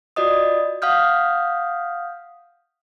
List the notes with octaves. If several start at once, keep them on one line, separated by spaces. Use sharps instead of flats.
F4 F#4 D5 D#5 D#6
F5 F#5 D#6 F6 G6